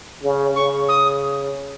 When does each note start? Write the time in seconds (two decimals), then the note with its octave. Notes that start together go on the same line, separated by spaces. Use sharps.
0.23 C#3
0.56 C#3 C#6
0.89 D#6